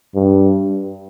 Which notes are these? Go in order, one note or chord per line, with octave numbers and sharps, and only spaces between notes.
G2